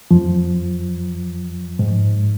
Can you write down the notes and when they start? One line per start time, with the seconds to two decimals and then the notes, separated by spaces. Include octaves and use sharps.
0.11 F2 F3
1.79 G#2